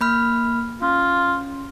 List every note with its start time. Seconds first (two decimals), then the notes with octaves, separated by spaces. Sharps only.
0.01 A#3 B5 F6
0.82 C#4 F4